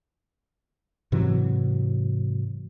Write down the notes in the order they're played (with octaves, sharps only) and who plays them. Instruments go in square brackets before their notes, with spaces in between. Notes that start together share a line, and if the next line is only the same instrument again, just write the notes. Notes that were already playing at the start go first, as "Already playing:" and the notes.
[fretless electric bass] G#2 C3 E3 F#3